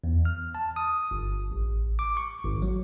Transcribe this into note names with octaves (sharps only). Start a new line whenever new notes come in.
E2
F6
A5
D#6
G1
A1
D6
C#6
G#1
F#3